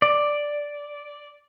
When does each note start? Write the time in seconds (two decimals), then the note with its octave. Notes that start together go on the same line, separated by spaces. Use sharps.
0.02 D5